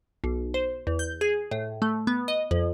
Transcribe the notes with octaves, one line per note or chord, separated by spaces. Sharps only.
B1
C5
E2
G6
G#4
A2
A3
B3
D#5
F2